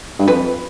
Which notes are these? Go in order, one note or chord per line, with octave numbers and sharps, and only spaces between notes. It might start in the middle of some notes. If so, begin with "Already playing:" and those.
G2
F2 B4